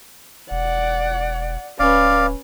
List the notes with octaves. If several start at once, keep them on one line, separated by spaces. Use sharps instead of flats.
E1 D5 F#5
D1 C#4 B4 D5 F5